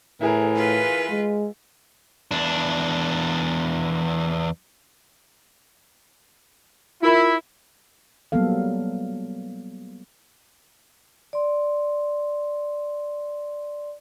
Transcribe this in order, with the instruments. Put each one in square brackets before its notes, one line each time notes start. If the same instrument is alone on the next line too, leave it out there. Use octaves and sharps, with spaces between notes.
[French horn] A2 [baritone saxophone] E3 [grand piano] E4 G#4 A#4
[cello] F4 B4
[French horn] G#3
[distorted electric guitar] E2 D4
[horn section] E4 [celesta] F4 A#4 B5
[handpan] F#3 G3 A#3 B3 A4 F5
[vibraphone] D5 C6